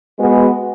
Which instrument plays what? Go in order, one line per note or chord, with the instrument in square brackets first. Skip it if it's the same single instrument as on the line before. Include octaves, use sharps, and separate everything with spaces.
[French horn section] G#3 B3 F#4